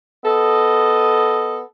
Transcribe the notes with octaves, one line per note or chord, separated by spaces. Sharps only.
B3 A4 D#5